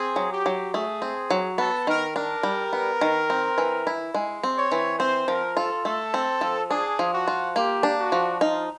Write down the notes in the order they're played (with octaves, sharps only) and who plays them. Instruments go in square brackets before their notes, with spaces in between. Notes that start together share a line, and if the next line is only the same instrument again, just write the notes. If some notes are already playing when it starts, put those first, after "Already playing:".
Already playing: [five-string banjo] C4 [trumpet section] G#4
[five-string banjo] F#3
[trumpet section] G4
[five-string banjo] F#3
[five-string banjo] A3 [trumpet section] G#4
[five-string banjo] C4
F#3
[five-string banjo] B3 [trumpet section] A4
[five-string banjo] D#3 [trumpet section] A#4
[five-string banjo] D4 [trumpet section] A#4
[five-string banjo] G3
B3
D#3
C4
E3
E4
G#3
C4
[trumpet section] C#5
[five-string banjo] E3
[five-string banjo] C4 [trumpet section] C5
[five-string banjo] F3 [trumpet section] A#4
[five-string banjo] F4 [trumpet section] A4
[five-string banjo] A3 [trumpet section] A4
[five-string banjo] C4
F3
[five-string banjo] D4 [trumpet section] G#4
[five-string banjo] F3
[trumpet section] F#4
[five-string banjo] F4
[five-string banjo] A#3 [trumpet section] G4
[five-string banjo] D4
[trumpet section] F#4
[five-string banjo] F3
[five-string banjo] D#4 [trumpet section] F4